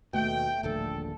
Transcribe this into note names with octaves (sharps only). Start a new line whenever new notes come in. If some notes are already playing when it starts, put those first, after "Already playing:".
D#2 B2 A3 G5
D#1 A#1 D3 A4